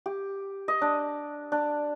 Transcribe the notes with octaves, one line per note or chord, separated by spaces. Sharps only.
G4
D#5
D4
D4